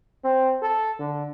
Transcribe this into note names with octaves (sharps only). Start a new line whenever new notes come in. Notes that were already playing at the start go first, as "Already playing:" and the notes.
C4
A4
D3